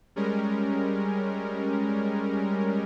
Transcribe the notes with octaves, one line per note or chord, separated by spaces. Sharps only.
G3 G#3 C#4 A#4